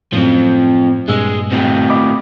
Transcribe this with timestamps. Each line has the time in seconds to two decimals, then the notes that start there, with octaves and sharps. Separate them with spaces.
0.13 F#2 A2 F3 C4
1.09 G2 A#2 G#3 E6
1.52 A2 C4
1.90 D#5 B5 D6